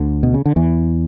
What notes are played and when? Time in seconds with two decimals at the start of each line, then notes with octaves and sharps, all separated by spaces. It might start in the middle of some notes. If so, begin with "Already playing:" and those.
Already playing: D2 D3
0.23 B2
0.34 C#3
0.46 D3
0.56 E2 E3